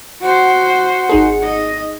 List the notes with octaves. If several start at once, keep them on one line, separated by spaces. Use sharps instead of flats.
F#4 C5 F#5
G#1 D#4 G#4
D#5